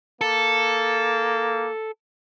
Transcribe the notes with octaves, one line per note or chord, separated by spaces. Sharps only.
A#3 A4